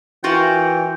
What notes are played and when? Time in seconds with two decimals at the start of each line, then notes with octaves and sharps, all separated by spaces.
0.24 E3 F4 F#4 A#4 G5